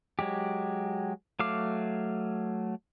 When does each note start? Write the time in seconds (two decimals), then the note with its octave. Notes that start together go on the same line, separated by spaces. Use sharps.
0.19 F#3 G#3 G4
1.40 F#3 A3 F5 D6